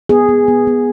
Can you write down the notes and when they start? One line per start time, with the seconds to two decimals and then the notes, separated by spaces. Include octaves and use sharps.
0.09 B3 G#4
0.29 B3
0.48 B3
0.67 B3